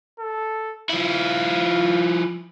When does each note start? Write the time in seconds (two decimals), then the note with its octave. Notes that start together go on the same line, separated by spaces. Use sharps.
0.20 A4
0.90 F3 E4 F5